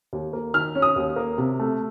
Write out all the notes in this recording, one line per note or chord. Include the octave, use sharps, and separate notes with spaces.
D#2
A#3
D#3 F6
C#4
D#6
D#2
A#3
C3
A3